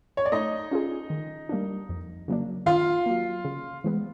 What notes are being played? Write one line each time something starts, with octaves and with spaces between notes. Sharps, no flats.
C#5
D5
A3 D#4 D#5
C#4 F4 G#4
D#3
G3 A#3 D4
F2
C#3 F#3 A#3 D4
D#3 F4 F5
F#3 A#3
C#3
E3 G#3 B3